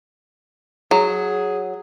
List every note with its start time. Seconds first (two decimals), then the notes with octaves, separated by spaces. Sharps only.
0.91 F#3 G#4